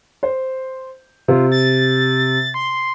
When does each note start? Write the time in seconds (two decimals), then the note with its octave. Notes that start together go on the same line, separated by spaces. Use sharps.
0.23 C5
1.28 C3 F4
1.52 A6
2.54 C6